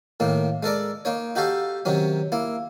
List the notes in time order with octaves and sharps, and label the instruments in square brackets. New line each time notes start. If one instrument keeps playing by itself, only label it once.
[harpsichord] A2 D#3 A#3
G#3 A4 A#4 D5
A#3 D#4 C#5
D#4 F#4 G4 A4 F5
C3 D#3 F#3 C#4
A#3 E4